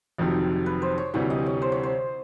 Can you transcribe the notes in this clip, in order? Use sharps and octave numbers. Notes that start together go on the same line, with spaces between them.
F1 F2 C3 D#3 F#3
B4
C5
C#5
D2 C3 E3 G3 C#5
D#5
C#5
C5
C#5
C5